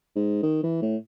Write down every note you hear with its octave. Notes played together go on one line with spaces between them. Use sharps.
G#2
D#3
E3
A2